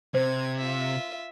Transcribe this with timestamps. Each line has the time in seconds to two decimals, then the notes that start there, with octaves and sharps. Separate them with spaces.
0.14 C3 C5 G#6
0.58 F4 E5